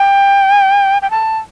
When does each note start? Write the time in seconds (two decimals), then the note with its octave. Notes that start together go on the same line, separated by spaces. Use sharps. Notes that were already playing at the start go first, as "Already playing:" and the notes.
Already playing: G5
1.02 G5
1.11 A5